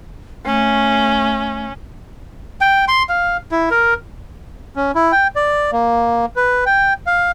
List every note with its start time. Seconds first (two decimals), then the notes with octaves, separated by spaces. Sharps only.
0.45 A3 C#4
2.61 G5
2.88 C6
3.09 F5
3.51 E4
3.71 A#4
4.75 C#4
4.95 E4
5.12 G5
5.36 D5
5.72 A#3
6.36 B4
6.66 G5
7.06 F5